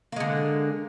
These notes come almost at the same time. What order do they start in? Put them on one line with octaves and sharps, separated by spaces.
A#3 G#3 D3